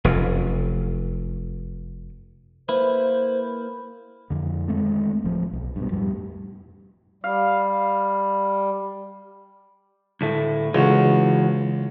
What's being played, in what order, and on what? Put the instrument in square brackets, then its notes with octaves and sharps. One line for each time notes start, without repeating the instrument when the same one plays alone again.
[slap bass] F1 F#2
[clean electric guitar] A#3 E4 B4 [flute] C5
[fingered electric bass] F2 D3
D#3 G#3 A3 C4
D1 F3
B1
G2 B2
F2 A2 G3
[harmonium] G3 [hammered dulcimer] F5
[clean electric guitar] D2 A2 A3
[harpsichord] C#2 [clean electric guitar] E3 F#4